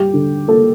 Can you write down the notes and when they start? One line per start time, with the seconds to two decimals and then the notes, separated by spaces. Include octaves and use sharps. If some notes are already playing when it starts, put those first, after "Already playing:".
Already playing: G3 G4
0.13 D3
0.48 A#3 A4